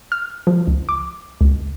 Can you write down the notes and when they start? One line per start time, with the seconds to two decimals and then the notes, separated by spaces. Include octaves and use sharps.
0.12 F6
0.47 F3
0.67 C#2
0.89 D6
1.41 C#2